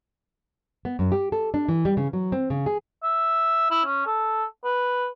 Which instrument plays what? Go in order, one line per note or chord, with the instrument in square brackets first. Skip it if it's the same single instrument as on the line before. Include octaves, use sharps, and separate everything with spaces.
[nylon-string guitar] B3
F#2
G4
A4
D4
E3
G3
C#3
F#3
C4
C#3
G#4
[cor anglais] E5
E4
C#4
A4
B4